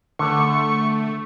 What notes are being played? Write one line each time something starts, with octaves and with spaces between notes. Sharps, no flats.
D3 A3 C#6